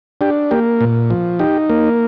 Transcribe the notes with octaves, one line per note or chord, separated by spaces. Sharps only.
D4 G4
A#3 G4
A#2
F3
D#4 G4
A#3